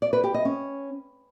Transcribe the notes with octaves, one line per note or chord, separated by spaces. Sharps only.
D5
B4
G4
D#5
C#4